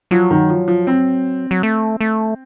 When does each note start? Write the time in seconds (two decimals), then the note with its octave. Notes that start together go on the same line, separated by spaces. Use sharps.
0.11 F3 F#3
0.31 D#3
0.50 F3
0.68 F3
0.87 C4
1.51 F#3
1.63 A3
2.01 A3